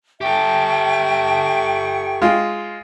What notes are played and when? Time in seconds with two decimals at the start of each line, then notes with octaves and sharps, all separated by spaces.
0.21 G4 A4 E5 G5 C#6
2.22 G#3 F4